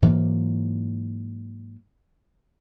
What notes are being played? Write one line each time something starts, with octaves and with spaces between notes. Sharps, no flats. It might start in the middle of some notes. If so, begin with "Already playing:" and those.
G#2 E3 F#3 A#3